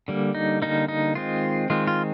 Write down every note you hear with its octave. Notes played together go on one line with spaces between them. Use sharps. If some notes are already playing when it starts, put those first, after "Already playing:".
D3 G3 A#3
D#4
D3 G3 A#3 D#4
D#4
D#3 G#3 C4 F4
D#3 G#3 C4 F4
F4